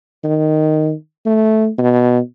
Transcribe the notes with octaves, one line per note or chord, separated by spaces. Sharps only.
D#3
A3
B2